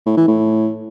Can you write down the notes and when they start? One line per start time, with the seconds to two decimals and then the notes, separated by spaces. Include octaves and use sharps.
0.06 A2
0.17 E3
0.28 A2